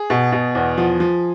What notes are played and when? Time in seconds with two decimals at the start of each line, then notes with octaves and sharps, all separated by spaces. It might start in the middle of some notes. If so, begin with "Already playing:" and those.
Already playing: G#4
0.10 B2
0.32 B2
0.55 E2
0.78 F3
1.00 F3